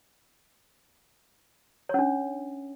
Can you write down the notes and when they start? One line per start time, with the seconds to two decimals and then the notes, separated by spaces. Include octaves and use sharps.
1.89 C#5
1.94 C#4
1.99 D4